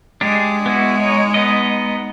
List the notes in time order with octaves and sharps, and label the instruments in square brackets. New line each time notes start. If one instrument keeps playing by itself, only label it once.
[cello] G#3 [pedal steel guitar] D4 G4 G#4
[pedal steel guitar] B3 E4 F#4
D#4 C#5
B3 D#4 D#5